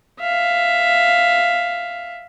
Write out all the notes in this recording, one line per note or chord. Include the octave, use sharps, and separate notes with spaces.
E5 F5